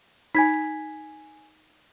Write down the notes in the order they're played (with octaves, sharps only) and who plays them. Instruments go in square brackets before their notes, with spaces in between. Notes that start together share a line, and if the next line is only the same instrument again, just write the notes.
[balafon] D#4 [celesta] G#5 G#6 B6